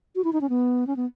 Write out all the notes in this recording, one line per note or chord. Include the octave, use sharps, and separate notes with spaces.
F#4
E4
D#4
C#4
B3
C#4
B3